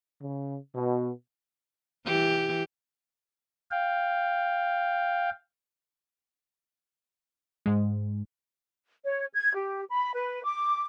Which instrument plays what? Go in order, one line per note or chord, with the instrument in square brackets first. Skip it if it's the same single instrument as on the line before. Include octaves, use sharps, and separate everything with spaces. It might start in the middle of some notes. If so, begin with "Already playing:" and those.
[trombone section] C#3
B2
[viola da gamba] E3 G4
[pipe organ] F5 G5
[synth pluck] G#2 G#3
[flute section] C#5
G#6
G4
B5
B4
D6